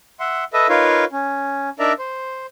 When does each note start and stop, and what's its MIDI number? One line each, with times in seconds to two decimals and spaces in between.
0.20 0.44 76
0.20 0.44 78
0.20 0.44 84
0.53 0.67 69
0.53 0.67 71
0.53 0.67 75
0.53 0.67 76
0.69 1.05 63
0.69 1.05 65
0.69 1.05 70
0.69 1.05 71
0.69 1.05 73
0.69 1.05 77
1.12 1.70 61
1.79 1.93 62
1.79 1.93 63
1.79 1.93 70
1.79 1.93 74
1.79 1.93 76
1.79 1.93 82
1.99 2.46 72